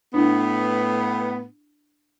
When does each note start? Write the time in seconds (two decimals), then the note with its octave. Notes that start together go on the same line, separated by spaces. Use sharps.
0.14 A2 B3 D4 E4